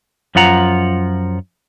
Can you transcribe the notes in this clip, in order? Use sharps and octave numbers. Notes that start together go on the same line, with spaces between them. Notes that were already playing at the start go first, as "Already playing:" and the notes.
F#2 F3 F4 F#5 A#5